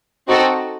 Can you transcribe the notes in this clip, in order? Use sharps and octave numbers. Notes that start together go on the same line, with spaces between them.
C4 D#4 F#4 A4